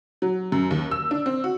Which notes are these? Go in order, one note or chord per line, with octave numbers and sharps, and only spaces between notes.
F#3
F#2
D#2
E6
D4
C4
F#4